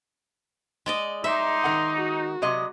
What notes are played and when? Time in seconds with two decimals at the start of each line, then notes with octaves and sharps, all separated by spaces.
0.86 G#3 D5 D#5
1.24 D#4 E5 C6 D6
1.64 D#3 A#4 F#5
1.97 F#4
2.42 C3 F#3 D#5